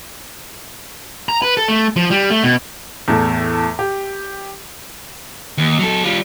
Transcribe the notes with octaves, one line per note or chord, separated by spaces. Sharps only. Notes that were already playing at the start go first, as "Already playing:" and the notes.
A#5
B4
A4
A3
F3
G3
A3
B2
E2 A2 A4
G4
D#2
F#3 A4
G3 F4